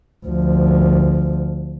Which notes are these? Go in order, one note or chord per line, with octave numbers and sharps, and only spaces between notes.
D2 F3